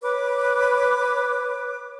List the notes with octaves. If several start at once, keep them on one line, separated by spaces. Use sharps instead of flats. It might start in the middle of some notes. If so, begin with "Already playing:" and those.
B4 C#5 D6